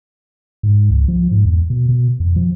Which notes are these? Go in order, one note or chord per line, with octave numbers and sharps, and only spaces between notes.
G#2
C#2
F3
G#2
E2
B2
B2
F2
F3